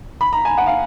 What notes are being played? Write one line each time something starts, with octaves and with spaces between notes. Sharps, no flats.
B5
A#5
G#5
F#5
F5